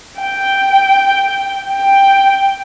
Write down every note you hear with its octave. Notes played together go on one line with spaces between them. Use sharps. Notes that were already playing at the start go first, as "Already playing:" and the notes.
G5
G5